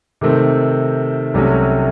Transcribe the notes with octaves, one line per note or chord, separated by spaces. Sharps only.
C3 D#3 A3 C4
C2 C3 F#3 A3 C#4